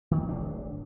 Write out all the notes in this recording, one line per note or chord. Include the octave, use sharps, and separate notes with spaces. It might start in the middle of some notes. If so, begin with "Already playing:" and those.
D#3
D1 G#1 D4